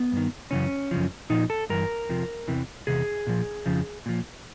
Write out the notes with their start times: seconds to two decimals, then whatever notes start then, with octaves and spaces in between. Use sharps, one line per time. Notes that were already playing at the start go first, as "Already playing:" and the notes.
Already playing: B3
0.12 G2 D#3
0.51 F#2 C#3 E3 C#4
0.91 F#2 C#3 F3
1.30 A#2 F3 D#4
1.50 A4
1.70 G2 E3 A#4
2.09 F2 C3 F3
2.48 E2 C3 E3
2.87 E2 C3 G#4
3.27 A#2 F3
3.66 F2 C#3 F3
4.06 A#2 F3